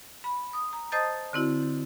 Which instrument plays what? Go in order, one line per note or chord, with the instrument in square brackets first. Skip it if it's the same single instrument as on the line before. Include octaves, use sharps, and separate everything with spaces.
[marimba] B5
D#6
A#5
C5 D#5 A5 D#6 G6 A6
D3 C4 E4 F#4